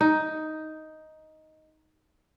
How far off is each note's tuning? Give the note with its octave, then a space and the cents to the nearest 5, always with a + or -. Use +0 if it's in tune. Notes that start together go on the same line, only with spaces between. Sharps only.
D#4 +5